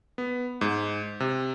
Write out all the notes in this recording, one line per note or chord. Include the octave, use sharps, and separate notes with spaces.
B3
G#2
C3